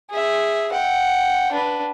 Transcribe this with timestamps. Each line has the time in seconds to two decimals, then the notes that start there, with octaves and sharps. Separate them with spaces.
0.11 G#4 E5
0.72 F#5 G5
1.52 D4 B4